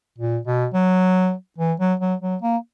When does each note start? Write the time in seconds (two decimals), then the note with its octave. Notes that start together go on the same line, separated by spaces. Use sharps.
0.18 A#2
0.47 B2
0.74 F#3
1.58 E3
1.80 F#3
2.00 F#3
2.21 F#3
2.42 A#3